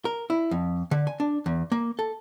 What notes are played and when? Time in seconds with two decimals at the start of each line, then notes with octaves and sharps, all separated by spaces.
0.05 A#4
0.30 E4
0.51 F2
0.91 D3
1.07 G#5
1.20 D4
1.46 E2
1.72 A#3
1.99 A4